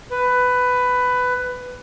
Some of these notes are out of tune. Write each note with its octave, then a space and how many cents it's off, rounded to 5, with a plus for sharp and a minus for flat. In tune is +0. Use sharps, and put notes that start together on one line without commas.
B4 +15